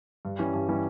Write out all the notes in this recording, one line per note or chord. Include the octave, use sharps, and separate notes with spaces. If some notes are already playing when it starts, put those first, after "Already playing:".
G2
E3 G3 C#4
G2
E3 G3 C#4